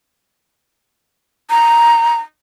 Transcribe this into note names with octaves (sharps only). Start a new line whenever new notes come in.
A#5